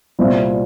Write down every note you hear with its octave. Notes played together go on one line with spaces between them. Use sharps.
C2 A#2 G3 C4 E4